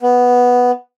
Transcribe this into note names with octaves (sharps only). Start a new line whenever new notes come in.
B3